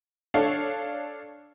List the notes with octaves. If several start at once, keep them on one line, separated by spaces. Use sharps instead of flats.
D4 A4 C#5 F5